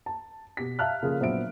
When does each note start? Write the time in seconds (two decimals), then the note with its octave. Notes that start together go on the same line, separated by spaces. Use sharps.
0.06 A5
0.57 B2 G4 B6
0.79 E5 F5 A5 F6 F#6
1.02 C#3 F3 A#3 F4 G#4 A4
1.20 A#1 F#3 B3 C5 E5 D7